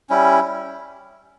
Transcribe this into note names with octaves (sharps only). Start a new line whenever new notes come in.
G3 C#4 E4